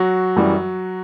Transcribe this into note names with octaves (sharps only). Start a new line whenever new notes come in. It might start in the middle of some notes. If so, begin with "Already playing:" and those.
Already playing: F#3 F#4
F#2 E3 G3